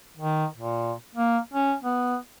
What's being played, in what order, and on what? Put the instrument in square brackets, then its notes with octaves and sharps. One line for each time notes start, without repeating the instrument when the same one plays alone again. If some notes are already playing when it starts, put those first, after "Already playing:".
[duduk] D#3
A#2
A#3
C#4
B3